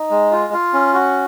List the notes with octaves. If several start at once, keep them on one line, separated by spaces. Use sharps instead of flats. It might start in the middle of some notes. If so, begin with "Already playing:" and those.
Already playing: D#4
G#3
F4
F4
C#4
F#4